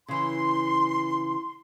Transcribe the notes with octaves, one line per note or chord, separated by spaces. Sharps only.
C#3 E3 C6